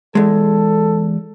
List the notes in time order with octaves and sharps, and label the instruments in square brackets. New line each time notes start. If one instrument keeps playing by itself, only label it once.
[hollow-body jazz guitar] E2 G#3 [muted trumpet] A4